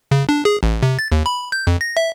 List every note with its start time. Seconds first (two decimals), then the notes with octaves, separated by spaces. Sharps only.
0.11 C#3
0.29 D4
0.45 G#4
0.63 A1
0.83 C3
0.99 A6
1.12 D#2
1.26 B5
1.52 G6
1.67 F2
1.81 A#6
1.97 E5